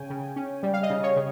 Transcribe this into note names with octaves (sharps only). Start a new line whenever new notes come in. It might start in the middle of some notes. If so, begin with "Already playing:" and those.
Already playing: C#3 C#4 G5 G#5
C#3
C#4
G3
F5
D#5
C#3
C#5
C#3